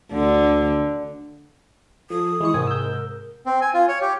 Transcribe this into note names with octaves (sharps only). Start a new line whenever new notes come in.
D2 D3
F3 A4 D#6
E3 G#3 E4 C#6
G#2 C3 C4 A#4 G#5
E6 G6
C4
G#5
F4
C#5
G4